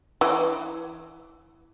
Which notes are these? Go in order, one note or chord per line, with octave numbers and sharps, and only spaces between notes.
E3